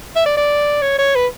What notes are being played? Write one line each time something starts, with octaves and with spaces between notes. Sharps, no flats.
E5
D5
D5
C#5
C#5
B4